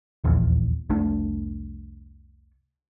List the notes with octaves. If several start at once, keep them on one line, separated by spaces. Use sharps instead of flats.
D#1 A#1 E2
F1 C2 A3 D4